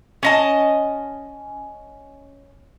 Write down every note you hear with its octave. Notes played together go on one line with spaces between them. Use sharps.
C#4 D#5 A5